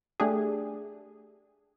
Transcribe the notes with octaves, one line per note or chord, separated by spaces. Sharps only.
A3 D4 G4 G#4